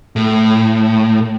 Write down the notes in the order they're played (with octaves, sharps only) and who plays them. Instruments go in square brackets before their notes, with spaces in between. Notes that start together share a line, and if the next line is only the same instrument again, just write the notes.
[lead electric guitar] A2